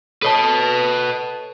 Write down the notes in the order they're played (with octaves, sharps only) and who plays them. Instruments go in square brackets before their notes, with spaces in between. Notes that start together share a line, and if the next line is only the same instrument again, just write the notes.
[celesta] A4 C#5 A5 [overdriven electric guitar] B4 D#5